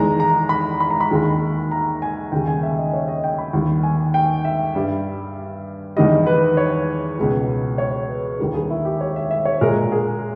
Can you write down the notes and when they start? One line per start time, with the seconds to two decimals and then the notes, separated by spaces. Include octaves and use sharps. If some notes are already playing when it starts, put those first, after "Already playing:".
Already playing: E2 D#3 G#3 A#5
0.20 A#5
0.49 B5
0.80 B5
0.90 A#5
1.01 B5
1.11 D#2 D#3 G#3
1.71 A#5
2.02 G#5
2.32 D#2 C#3 G3 G5
2.48 G#5
2.63 E5
2.78 D#5
2.93 C#5
3.08 D#5
3.24 G5
3.38 B5
3.53 D#2 D#3 G3
3.83 G#5
4.14 G5
4.45 E5
4.75 G2 G3
5.97 E2 D#3 G3 D#5
6.27 B4
6.57 C#5
7.19 C#2 B2 G#3
7.78 C#5
8.09 B4
8.39 D#2 D#3 G3 A#4
8.54 G#4
8.70 E4
8.85 G4
9.01 C#5
9.16 E5
9.31 E5
9.45 C#5
9.61 A#2 G#3 A#4
9.92 G#4